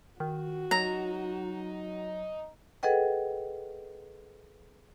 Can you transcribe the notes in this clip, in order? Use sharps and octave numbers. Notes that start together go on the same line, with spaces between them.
D#3 F#4
F#3 D#4 A#5
G#4 A4 B4 D#5 F#5 G5